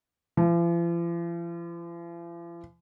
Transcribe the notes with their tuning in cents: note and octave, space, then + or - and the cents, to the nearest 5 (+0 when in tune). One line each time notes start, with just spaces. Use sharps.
F3 -45